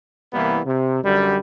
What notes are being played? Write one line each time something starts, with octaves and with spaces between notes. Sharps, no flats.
C2 E3 G3 A#3 B3
C3
F#2 D3 G3